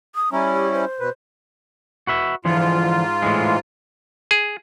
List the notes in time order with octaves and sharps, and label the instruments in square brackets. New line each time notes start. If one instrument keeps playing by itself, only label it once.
[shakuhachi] D#6
[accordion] G3 C#4 E4 [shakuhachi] A#5
[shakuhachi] G4
C5
[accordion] B2 B4
[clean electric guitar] F#4 B4 E5
[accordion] G#2 F4 [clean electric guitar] D3 E3 F3
[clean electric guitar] A2 E3 G#3
[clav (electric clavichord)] G#4